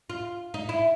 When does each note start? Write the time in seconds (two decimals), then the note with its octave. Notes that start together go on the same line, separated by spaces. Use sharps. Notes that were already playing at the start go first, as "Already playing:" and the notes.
0.10 F4
0.54 D#4
0.69 E4